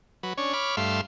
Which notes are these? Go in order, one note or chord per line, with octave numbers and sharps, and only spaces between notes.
F#3 B4
C#4 D4 C#5
C#5 B5 D6 F6
G2 A3 E5 F5 C6